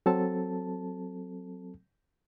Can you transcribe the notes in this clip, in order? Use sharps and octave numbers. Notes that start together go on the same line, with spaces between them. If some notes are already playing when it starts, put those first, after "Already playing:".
F#3 C4 A4 A5